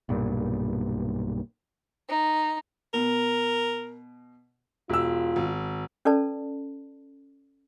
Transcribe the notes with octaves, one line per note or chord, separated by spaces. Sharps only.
B1 G2 A#2
D#4
B2 A#4
E1 F4 E6
G#1
C#4 A4 B4 D5 A5